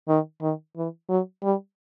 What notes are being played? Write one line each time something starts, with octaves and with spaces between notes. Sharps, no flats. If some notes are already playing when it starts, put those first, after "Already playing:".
D#3
D#3
E3
F#3
G3